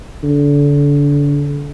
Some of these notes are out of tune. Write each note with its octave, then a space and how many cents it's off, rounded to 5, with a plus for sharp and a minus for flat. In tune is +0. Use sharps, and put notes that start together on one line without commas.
D3 -30